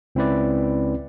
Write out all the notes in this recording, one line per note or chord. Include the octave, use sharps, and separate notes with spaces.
C#2 C4 C#4 E4 B4 D5